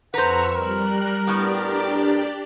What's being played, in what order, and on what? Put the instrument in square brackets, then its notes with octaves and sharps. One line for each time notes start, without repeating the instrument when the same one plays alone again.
[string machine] F2 C#6 E6 [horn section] A4 F#5 A#5 [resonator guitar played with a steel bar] B4 C5
[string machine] G3 F#6 [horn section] A#4
[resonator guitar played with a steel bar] A2 B3 [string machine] D4 G4 D5